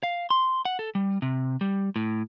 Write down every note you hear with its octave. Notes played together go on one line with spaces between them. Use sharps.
F5
C6
F#5
A4
G3
C3
G3
A2